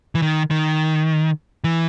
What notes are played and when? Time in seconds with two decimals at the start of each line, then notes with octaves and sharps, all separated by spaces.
0.15 E3
0.22 D#3
0.51 D#3
1.64 E3